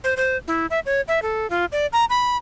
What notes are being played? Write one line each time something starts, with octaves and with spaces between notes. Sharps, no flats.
C5
C5
E4
E5
C#5
E5
A4
F4
D5
A#5
B5